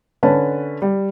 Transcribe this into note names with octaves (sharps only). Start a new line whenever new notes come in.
D3 C#4 B4 C#5 A5
G3